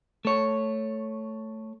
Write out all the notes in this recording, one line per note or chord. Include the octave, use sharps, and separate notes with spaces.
A3 C#5